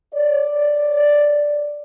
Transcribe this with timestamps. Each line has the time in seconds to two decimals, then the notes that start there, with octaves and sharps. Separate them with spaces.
0.14 C#5 D5